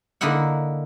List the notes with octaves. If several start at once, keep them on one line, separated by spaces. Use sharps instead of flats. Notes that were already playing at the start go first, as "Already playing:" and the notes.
D3 A#3 D#4 E4 F#5